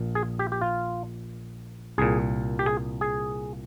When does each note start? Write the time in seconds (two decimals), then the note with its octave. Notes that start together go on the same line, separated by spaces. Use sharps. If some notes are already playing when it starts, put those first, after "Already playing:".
Already playing: A#1 A#2
0.15 G#4
0.39 G4
0.52 G4
0.61 F4
1.98 C2 A#2 G#4
2.59 G4
2.66 G#4
3.01 G#4